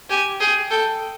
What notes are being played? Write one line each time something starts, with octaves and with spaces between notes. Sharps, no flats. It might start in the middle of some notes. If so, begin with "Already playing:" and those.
G4 G#5
G#4 G5
A4 G5